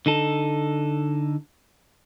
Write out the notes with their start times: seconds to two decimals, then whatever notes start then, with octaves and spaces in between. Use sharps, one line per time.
0.06 D3 D#4 A4